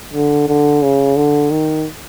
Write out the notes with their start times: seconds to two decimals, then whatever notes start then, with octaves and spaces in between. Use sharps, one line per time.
0.13 D3
0.49 D3
0.83 C#3
1.16 D3
1.51 D#3